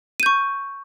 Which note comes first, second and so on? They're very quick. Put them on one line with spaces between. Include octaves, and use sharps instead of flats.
D#7 G6 C#6